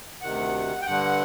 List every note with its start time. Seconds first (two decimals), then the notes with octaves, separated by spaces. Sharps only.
0.22 D2 C3 D#3 F#5
0.82 G5
0.86 G2 D3 F#5